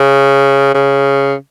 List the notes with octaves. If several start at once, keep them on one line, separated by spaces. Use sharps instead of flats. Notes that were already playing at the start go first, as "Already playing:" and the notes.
Already playing: C#3
C#3